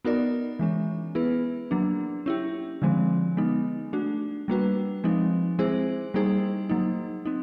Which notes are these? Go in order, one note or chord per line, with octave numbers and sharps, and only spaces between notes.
B3 D#4 F#4 A#4 D5
E3 G#3 C#4
B3 E4 G#4 B4
F#3 A#3 D4
C#4 E4 G4
D3 F3 G#3 C4
G#3 B3 D#4
A3 D4 F#4
G3 A#3 D4 F#4 B4
F3 G#3 C4 D#4
G#3 C4 E4 G#4 C5
G3 A#3 D#4 G#4 C5
F#3 A#3 D#4
C4 D#4